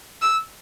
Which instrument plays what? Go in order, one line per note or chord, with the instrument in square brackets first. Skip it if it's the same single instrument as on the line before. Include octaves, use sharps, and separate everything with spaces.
[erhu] E6